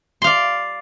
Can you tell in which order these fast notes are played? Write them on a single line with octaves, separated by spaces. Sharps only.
C6 F5 D5